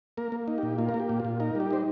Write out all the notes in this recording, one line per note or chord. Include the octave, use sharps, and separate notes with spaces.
A#3 A#4
A#3
D#4
A#2 G4
A#3 F4
A#4
A#3
G4
A#2
A#2 F4
D#4 A#4
G3 G4
D#4 C5